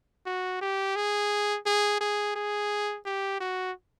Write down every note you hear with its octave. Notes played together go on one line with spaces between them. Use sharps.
F#4
G4
G#4
G#4
G#4
G#4
G4
F#4